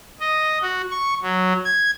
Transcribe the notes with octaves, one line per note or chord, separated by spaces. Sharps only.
D#5
F#4
C#6
F#3
G#6